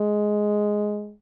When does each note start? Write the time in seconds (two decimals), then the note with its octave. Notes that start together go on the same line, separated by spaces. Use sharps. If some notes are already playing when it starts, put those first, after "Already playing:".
Already playing: G#3